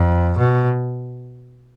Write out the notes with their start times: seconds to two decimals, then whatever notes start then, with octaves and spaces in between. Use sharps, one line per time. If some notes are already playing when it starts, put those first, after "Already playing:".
Already playing: F2
0.38 B2